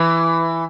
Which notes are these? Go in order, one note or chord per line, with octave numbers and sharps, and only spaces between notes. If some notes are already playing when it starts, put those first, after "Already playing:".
Already playing: E3